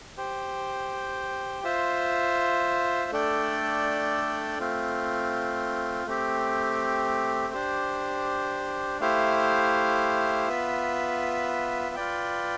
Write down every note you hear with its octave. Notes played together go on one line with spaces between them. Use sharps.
G4 C5 G5
F4 C5 E5
A3 D4 A4 D5 G5
A3 C4 F4
A3 C4 G4
D4 G4 C5
A3 E4 G4 C5 F5
B3 F4 B4 E5
F4 B4 D5 G5